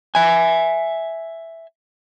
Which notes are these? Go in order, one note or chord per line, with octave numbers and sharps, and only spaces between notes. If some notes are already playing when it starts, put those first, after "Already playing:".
E5 G#5